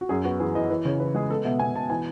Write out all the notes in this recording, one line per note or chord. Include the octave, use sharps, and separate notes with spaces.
F#4
F#2 G#4
B3 F#4
E3 G#4
E3 D#5
E3 B4
C#3 C#5
E3 B4
G#3 G#4
B3 A4
B2 E5
B2 G#5
B2 A5
E3 G#5